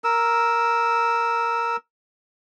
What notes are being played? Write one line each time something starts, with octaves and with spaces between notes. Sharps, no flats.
A#4 E6